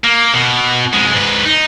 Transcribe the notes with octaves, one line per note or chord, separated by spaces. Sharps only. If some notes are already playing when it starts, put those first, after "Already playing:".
A#3
B2
F2 G#3
G#2 B4
D#4